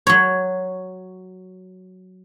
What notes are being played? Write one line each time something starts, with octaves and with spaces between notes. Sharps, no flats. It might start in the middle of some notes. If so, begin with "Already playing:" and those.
F#3 C#5